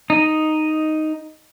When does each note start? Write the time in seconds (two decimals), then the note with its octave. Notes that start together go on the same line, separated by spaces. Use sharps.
0.10 D#4